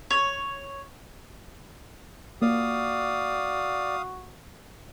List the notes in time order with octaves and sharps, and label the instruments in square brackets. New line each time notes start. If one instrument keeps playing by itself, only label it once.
[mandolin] C#5
[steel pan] A#3 [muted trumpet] F#4 [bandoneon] D5 [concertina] F5 D#6